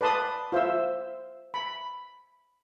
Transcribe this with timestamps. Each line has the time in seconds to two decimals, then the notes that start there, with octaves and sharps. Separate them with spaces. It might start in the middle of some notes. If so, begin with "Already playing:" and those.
0.01 B4 D5 A5 C6 D#6
0.52 F4 C5 E5 E6
1.54 B5